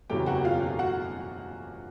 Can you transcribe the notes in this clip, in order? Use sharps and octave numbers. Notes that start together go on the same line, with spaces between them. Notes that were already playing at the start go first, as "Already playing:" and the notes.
F#1 E2 B2 F#3 A3 G4 G5
F#4 F#5
F4 F5
F#4 F#5